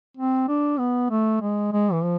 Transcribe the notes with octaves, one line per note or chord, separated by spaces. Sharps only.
C4
D4
B3
A3
G#3
G#3
E3
F3